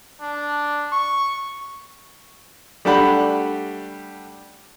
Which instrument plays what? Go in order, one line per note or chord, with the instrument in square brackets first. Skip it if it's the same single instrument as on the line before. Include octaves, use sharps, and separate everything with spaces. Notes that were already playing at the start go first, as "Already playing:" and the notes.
[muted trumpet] D4
C#6
[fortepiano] G3 A3 D4 G4 F#5 B5